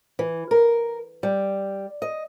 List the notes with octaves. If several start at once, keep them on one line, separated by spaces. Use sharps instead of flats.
E3
A#4
G3
D#5